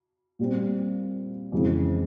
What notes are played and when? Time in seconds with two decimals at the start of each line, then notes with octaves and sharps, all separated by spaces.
0.39 A#2 G3 C4
1.52 F2 C#3 E3 G#3 C4